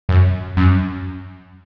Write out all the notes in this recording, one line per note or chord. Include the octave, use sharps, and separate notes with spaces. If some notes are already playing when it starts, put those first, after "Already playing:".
F#2
F#2